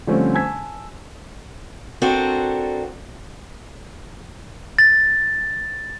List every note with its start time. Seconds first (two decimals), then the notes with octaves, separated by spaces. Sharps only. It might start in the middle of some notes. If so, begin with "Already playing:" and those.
0.07 D3 F3 G3 A3 C4 C#4
0.34 G#5 A5 E6 G#6 B6
2.02 C4 D4 F#4 A4 A#4
4.78 A6